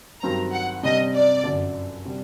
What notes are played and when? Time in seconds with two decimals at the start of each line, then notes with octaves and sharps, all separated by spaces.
0.23 G2 D#3 F#3 C4 A#5
0.53 F#5
0.83 C3 G3 D4 D#5
1.14 D5
1.44 G1 F#2 D3
2.06 C3 G3 D4